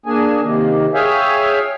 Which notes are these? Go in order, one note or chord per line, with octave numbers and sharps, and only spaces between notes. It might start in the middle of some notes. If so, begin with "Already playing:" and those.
A#3 D4 G#4 G#5
C3 D#3 A#3
G#4 C#5 E5 F5 G5 G#5